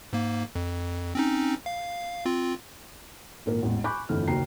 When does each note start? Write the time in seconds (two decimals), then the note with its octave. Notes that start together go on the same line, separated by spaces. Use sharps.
0.13 G#2 A#3
0.55 F2
1.15 C4 C#4 D#4
1.66 F5
2.26 C4 F4
3.46 G#1 A#2 A#4
3.62 A1 E2 G#2
3.84 G#5 B5 C#6 D6 F#6 G6
4.09 G1 F2 E3 A3 F6
4.28 F#1 D#2 F#4 G5 A#5 C7